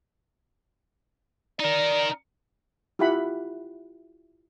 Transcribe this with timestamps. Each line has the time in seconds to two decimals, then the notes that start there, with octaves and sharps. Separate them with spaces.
1.60 D#4 A#4 D5
2.99 E4 F4 G4 F#5 B5